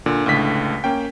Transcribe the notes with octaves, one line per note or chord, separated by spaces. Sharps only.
A#2 D3
C#2 A2 D3 B6
A#3 C#4 G5